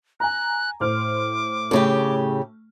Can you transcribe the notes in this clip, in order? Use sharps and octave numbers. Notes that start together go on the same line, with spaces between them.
G#5 A#5 F#6
A2 C5 D6 F6
A2 C#3 A3 G4